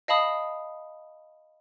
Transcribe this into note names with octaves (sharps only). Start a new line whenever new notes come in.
D#5 F5 A5 B5 D#6